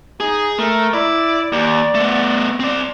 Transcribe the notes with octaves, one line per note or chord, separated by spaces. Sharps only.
D#4 G#4
A3 A#4
E4 D5
D#2 D5
A3 B3
C4 D5